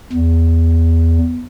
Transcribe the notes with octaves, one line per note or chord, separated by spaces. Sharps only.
E2